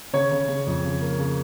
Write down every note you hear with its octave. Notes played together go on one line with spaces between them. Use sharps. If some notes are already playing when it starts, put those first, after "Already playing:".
C#3 C#5
C#3
C#3
F2
C#3
A#3
C#3